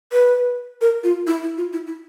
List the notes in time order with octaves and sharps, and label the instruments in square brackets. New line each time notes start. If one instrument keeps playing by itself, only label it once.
[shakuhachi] B4
A#4
F4
E4
E4
F4
E4
E4